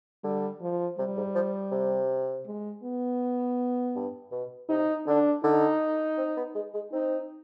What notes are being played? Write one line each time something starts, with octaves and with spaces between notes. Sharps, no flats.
D3 G3
F3
C3 G3
G#2
F3
C3
G#3
B3
G2
B2
C3 D#4
D3 D4
D3 D#4
C4
B3
G#3
G#3
C4 D#4